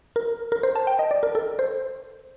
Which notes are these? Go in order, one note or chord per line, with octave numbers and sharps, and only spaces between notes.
A#4
A#4
C5
A5
G5
D#5
D5
A#4
A4
C5